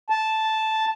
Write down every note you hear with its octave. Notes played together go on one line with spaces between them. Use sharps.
A5